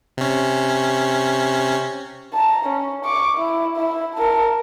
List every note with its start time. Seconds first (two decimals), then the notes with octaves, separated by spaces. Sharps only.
0.17 C3 C#4
2.33 A5 A#5
2.65 C#4
3.04 C#6 D6
3.37 E4
3.76 E4 E5
4.15 A#4 A5